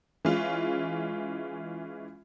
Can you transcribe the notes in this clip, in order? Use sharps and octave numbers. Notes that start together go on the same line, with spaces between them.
E3 G#3 C#4 F4